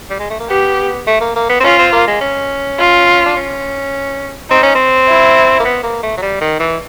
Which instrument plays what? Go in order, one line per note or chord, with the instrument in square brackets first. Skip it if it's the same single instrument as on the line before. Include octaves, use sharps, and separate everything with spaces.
[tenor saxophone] G3
G#3
A3
A#3
[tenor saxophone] B3 [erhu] G4
[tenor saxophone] A3
A#3
A#3
B3
C4
[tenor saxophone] C#4 [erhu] F4
[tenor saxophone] C4
A#3
G#3
C#4
[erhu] F4
[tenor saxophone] D4
C#4
[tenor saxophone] C4 [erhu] D#4
[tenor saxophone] C#4
C4
[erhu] E4
[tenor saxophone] A#3
B3
A#3
A3
F#3
G3
D#3
E3